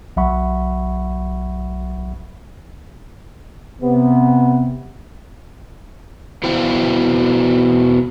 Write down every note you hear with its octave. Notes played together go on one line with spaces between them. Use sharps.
B1 F#3 E5 F#5 B5 C#6
C3 B3
B2 E4 C5 F5 G5